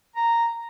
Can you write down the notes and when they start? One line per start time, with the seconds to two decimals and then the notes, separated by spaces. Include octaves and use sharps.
0.16 A#5